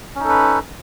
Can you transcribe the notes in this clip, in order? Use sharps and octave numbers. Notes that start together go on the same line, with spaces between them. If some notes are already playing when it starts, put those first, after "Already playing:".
C#4 D#4 A4 B4